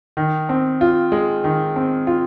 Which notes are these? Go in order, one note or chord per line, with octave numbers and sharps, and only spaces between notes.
D#3
C4
F4
G#3
D#3
C4
F4